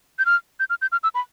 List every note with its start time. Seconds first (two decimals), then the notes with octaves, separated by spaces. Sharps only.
0.19 G6
0.26 F6
0.60 G6
0.70 F6
0.82 G6
0.92 F6
1.03 E6
1.15 B5